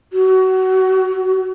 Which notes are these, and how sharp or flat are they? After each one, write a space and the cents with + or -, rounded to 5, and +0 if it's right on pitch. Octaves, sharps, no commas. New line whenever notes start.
F#4 +25